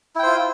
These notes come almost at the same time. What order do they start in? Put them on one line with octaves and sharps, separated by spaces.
E4 G5 C5 F4